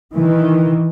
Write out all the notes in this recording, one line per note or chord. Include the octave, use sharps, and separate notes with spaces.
D#3 E3